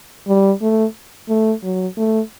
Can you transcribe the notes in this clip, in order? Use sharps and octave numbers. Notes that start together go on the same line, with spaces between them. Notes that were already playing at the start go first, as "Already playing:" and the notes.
G3
A3
A3
F#3
A3